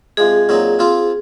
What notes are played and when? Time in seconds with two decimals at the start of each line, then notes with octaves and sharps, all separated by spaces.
0.17 C3 F3 G#3 G#4
0.49 A#2 F#3 C4 D#4
0.79 F3 C4 F4 C5